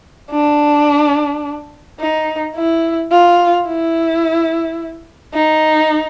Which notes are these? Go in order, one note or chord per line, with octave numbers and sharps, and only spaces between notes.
D4
D#4
E4
F4
E4
D#4